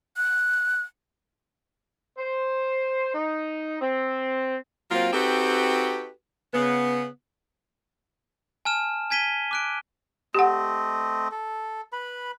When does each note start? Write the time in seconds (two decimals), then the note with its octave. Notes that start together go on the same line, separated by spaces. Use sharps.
0.17 F#6
2.18 C5
3.15 D#4
3.81 C4
4.91 F#3 A#3 C4 F4
5.13 C4 D#4 F#4 G4 A4 B4
6.54 C#3 B3
8.65 G#5 A5 F6 E7
9.10 G#5 G#6 B6 D#7 G7
9.51 D6 F#6 D7
10.35 A3 C4 G4 D#5 F#5
11.31 A4
11.92 B4 B5